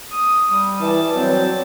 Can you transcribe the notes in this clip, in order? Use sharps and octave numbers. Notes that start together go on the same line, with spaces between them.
D#6
G3
E3 D5 A5
F#3 C4